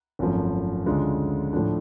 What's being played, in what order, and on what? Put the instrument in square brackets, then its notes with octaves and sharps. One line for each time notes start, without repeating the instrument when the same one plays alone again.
[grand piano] G#1 F#2 F3 A3
D2 C#3 G#3 D4 F4
A2 F3 A3 D4